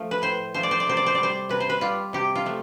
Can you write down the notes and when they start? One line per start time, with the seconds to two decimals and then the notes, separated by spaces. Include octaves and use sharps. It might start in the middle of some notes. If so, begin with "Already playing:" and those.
Already playing: F3 A3
0.11 B4
0.22 A2 C5
0.54 F3 A3 C5
0.63 D5
0.71 C5
0.80 D5
0.87 C3 C5
0.97 D5
1.06 C5
1.15 G3 D5
1.23 C5
1.49 C3 B4
1.60 C5
1.70 B4
1.81 G3 F4
2.13 C3 G4
2.36 F4
2.46 F3 A3